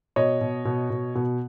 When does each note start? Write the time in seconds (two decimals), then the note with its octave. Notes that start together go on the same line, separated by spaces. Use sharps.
0.16 B2 C#5 D#5
0.41 B2
0.65 B2
0.90 B2
1.15 B2